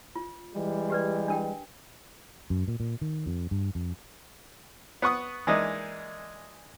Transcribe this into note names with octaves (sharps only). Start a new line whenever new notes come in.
F4
E3 G3 G#3
G4 B4 D5
D4 A#4 G5
F#2
A#2
A#2
D#3
F2
G2
F2
B3 F#5 C#6 D#6
E3 G#3 A#3 D4 D#4